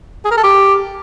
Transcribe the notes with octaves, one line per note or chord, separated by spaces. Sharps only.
G#4
A#4
A4
G4